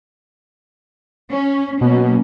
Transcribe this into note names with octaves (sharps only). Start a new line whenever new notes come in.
C#4
B2 F#3 A#3 C#4